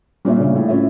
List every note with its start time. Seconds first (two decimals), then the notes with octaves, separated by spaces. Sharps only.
0.25 A#2 G3 D4 F4 C#5 E5
0.40 C#3
0.55 A2
0.69 C#4 F4 C#5 E5